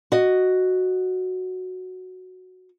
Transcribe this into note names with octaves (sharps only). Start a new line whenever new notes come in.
F#4 D#5